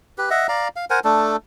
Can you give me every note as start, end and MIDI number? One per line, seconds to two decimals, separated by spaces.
0.18 0.30 67
0.18 0.30 71
0.30 0.47 75
0.30 0.47 76
0.30 0.47 78
0.48 0.68 74
0.48 0.68 77
0.48 0.68 82
0.76 0.85 77
0.90 1.00 70
0.90 1.00 72
0.90 1.00 78
0.90 1.00 80
1.05 1.36 57
1.05 1.36 62
1.05 1.36 69